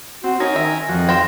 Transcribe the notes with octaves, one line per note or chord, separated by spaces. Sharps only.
C4 F#4
C#4 D#4 A#4 G#5 A#6
D#3 E5
F2 F3 F#4
C5 F5 G5 A#6